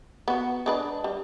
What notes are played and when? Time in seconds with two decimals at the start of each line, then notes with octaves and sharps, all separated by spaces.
0.28 B3 F#4
0.66 G#3 D4 B4
1.04 G3